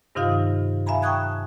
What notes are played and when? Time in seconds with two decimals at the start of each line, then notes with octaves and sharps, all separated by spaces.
0.15 G2 C3 D#3 D#4 F4 F5
0.86 E5 F5 G#5 A#5 B5
1.02 G5 A5 C#6 D#6 F#6 G#6